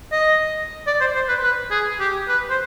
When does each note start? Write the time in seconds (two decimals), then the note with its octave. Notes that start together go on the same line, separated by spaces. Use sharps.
0.12 D#5
0.87 D5
1.01 C5
1.15 C5
1.28 B4
1.43 B4
1.71 G#4
2.00 G4
2.28 B4
2.50 C5